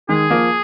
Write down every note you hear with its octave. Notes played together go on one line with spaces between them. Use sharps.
D#3 G#3 G#4
F3 A#3